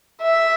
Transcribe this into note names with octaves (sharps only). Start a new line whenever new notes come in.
E5